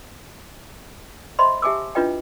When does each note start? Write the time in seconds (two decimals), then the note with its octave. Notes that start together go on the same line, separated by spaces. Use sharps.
1.39 C5 D#5 E5 B5 C6
1.62 G4 E5 G#5 A5 D6 E6
1.95 D4 E4 F4 B4 D#5 G5